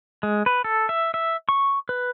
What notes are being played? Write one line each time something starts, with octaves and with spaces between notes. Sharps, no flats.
G#3
B4
A4
E5
E5
C#6
B4